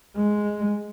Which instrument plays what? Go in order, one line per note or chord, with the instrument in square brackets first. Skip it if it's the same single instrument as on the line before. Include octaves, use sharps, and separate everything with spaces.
[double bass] G#3